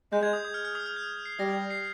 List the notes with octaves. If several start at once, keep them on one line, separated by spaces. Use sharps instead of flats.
G#3 G6
G#6
D#6
D#6
F6
F6
D#6
F6
G6
C7
G3 A#6
G#6
C7